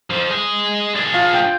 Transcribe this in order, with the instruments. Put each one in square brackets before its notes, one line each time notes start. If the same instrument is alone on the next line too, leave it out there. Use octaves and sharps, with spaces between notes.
[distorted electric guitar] F3 C4
G#4 D#5
D4 G#4
[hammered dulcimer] F4
G5